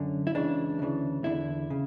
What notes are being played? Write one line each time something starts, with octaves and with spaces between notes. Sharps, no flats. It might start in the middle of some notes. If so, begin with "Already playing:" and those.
Already playing: F#2 D3 C#4
E4
C#2 C#3 E3 D4
D2 C#3 E3
E2 D3 E4
C#3